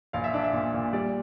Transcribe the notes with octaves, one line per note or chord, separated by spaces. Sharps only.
A#1 F5
E5
D4
E5
A#2
A#2
G3 D5